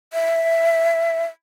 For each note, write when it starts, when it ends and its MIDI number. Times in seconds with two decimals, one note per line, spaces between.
0.13 1.24 76